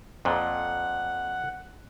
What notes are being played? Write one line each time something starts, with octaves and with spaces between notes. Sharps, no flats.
F2 A#2 F#5